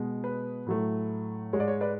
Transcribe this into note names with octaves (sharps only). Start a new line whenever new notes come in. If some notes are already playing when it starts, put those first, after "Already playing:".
Already playing: B2 G#3
B4
A2 F#3 A3
G#2 G#3 C#5
D5
C#5
B4 D5